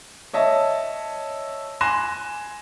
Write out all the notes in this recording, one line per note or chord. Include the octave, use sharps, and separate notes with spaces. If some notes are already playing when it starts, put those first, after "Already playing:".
C#5 D#5 E5 A5
G#5 C6 F#6 A#6 E7